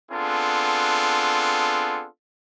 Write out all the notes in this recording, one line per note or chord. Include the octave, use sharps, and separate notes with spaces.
B3 C4 D4 F4 G#4 A4